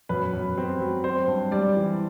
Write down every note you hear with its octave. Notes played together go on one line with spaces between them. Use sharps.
F#2 B4
F#2
C4
F#3
C4 C5
G2
G3 D5
E3